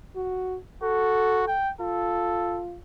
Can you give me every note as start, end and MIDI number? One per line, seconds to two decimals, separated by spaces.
0.16 0.57 66
0.83 1.44 66
0.83 1.54 69
1.47 1.71 79
1.81 2.78 65
1.81 2.61 69